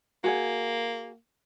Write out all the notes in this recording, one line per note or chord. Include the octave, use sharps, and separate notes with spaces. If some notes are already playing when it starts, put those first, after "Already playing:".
A#3 F#4 G#4 F#5